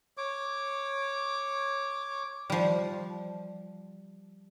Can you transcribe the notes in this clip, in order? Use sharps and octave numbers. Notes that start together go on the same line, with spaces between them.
C#5 D6
F3 G3